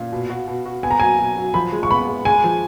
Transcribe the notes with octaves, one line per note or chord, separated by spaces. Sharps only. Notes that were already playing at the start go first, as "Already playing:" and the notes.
Already playing: A#2 F5
B2
F#4
B2
F#4
B3 G#5
A#5
F#3 G#5
B2
F#3
F3 B5
G#3
C#6
B3 B5
G#3
G#3 G#5
F3